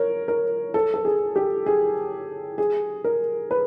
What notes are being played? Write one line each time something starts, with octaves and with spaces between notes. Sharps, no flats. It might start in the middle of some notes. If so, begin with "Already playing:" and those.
Already playing: A#4 C#5
A#4
A4
A4
G#4
G4
G#4
G#4
A#4
B4